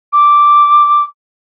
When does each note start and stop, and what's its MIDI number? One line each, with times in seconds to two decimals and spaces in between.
0.13 1.04 86